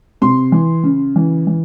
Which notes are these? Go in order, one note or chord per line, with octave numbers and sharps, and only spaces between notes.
C3 C6
E3
C#3
E3
E3